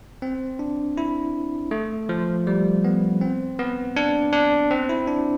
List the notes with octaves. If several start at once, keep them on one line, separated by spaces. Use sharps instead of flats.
C4
D4
E4
A3
F3
G3
B3
C4
B3
D4
D4
C4
E4
D4